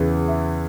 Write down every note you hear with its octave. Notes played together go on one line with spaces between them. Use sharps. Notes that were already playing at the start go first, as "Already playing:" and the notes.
Already playing: E2 C#3 E3
E5